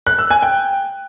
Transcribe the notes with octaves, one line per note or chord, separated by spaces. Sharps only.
F#6
E6
G#5
G5